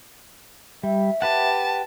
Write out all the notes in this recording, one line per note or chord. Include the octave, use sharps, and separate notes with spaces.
G3 E5
G4 B4 F#5 A5